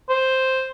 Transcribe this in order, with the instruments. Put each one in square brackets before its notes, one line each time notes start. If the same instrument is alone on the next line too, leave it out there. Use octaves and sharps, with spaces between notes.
[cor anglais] C5